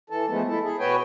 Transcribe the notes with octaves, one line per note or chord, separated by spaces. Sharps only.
E3 A4
E3 F3 G#3 A3 B3
E4 A4
G#4
B2 F#4 B4 C#5 G5 G#5